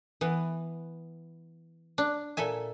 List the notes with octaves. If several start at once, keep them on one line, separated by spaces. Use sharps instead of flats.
E3 B3
D4
A#2 A4 E5 G#5